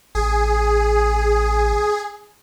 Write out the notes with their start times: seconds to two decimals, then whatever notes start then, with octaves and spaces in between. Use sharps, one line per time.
0.15 A1 G#4